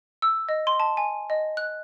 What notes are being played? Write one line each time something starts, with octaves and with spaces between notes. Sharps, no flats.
E6
D#5
C6
A5
G#5
D#5
F#6